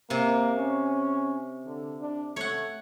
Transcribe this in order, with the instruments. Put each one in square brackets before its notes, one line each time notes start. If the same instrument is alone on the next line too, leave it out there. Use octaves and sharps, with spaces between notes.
[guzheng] C3 [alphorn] A#3
[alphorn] C#4
D3
D4
[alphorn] A3 [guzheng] C#5 F#5